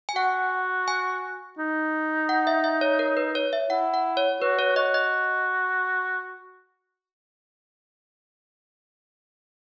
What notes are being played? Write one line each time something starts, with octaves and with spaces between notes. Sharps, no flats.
G#5
F#4 F#5
G#5
D#4
F#5
E5
E5
C#5
A#4
B4
C#5
E5
E4 F#5
F#5
C#5
F#4 B4
C#5
F#4 D#5
D#5